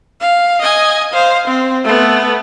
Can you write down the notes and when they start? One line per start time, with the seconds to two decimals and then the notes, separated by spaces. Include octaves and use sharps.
0.21 F5
0.61 D#5 G#5
1.13 C5 F5
1.47 C4
1.84 A3 B3